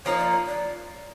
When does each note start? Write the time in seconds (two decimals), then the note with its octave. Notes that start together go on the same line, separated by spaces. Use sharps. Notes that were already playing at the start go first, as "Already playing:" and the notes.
0.06 F3 A#3 D#4 C#5
0.18 D5
0.30 C#5
0.46 D5